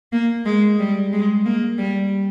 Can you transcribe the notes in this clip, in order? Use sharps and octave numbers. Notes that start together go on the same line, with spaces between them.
A#3
G#3
G3
G#3
A#3
G3